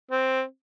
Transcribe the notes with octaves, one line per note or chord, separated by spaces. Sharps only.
C4